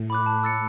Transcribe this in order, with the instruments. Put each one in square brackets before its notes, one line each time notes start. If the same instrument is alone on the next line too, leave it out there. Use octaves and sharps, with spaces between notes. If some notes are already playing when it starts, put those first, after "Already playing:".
Already playing: [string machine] A2
[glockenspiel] B5 D6 F#6
A5
E6 A6 C#7